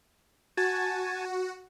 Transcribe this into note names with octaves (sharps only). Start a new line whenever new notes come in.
F#4 G#5 A5